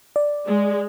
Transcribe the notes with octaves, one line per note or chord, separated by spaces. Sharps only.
D5
G#3